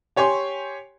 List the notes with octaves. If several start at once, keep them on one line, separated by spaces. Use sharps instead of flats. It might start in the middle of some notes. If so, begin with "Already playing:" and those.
G4 C#5 G#5 C6 C#6